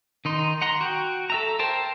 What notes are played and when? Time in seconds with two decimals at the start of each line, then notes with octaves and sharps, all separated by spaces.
0.25 D#3 D#4 C6
0.62 F#5 A#5 C6
0.81 F#4 G5
1.30 A4 E5 A#5
1.59 A#4 C5 G5 A5